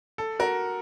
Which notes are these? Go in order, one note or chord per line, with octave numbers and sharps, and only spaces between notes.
A4
F#4 A#4